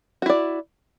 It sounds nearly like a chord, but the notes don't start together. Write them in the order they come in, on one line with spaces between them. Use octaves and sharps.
F#4 E4 D5